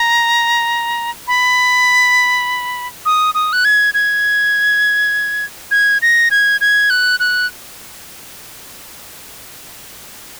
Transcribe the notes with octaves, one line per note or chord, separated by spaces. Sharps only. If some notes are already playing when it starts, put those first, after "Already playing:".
Already playing: A#5
B5
D#6
D#6
F#6
G#6
G#6
G#6
A#6
G#6
G#6
F#6
F#6